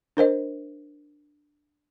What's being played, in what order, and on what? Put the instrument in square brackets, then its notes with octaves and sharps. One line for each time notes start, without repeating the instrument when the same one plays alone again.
[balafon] D4 A#4 C5 D#5